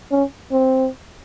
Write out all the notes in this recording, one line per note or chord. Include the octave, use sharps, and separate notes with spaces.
C#4
C4